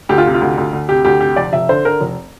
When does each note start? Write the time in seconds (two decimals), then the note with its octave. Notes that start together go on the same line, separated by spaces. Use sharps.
0.09 D2 G4
0.18 F4
0.26 C3
0.34 F4
0.42 D2
0.57 D2
0.73 D2
0.89 C3 G4
1.05 D2 G4
1.21 C3 G4
1.36 F1 D5
1.52 F1 E5
1.69 D3 C5
1.85 D3 A#4
2.00 F1